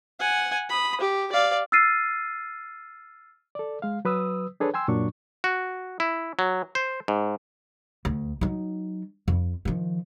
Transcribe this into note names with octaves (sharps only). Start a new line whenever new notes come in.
F#5 G#5
B5 D#6
G4
D5 F5
E6 F6 A6 C7 D#7
A4 D5
G#3 F5
F#3 B4 D#6 E6
D4 G#4 A4 B4 C#5
G5 G#5 C6 E6
F#2 A#2 F#3 D4 C#6
F#4
E4
F#3
C5
G#2
D2
F#3 D#4
F2
D#3 F3